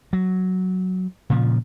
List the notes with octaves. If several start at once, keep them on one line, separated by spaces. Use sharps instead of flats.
F#3
A#2 C#3 F3